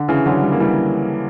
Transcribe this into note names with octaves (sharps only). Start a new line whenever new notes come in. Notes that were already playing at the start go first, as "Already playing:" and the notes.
Already playing: D3
C#3 E3
D3 F#3
G3
A#3
E3 G3